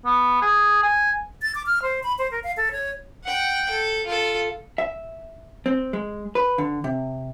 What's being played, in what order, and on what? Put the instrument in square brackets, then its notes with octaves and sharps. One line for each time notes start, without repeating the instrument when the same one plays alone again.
[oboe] B3
G#4
G#5
[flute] A6
D6
F6
C5
B5
C5
A#4
F5
A4
C#5
[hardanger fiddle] F#5 G5
A4
F4 A4
[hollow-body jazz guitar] E5
C4
G#3
B4
D3
C3